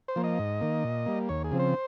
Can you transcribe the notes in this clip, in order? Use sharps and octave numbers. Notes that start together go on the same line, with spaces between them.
C5
F3 A#3
D#5
G#2
D#3 A#3
A#2
G3 A#3
D#2 C#5
G#4
C#3 F3 C4
C5